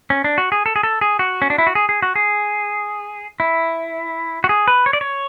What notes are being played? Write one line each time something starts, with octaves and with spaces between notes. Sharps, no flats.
C#4
D4
F#4
G#4
A4
G#4
A4
G#4
F#4
C#4
D4
E4
F#4
G#4
G#4
F#4
G#4
E4
F#4
G#4
B4
C#5
D5
C#5